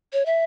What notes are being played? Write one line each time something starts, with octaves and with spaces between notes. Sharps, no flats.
C#5
E5